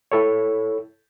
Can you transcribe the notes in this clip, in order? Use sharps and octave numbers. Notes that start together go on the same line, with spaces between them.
E4 A4 C#5